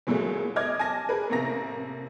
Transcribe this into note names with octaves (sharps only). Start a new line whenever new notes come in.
E2 A#2 F#3 G#3 A3
D#5 D6 F6 G#6
G#5 A5 A#6
G#4 A#4 B4
A1 F2 C3 A#3 A#5 A#6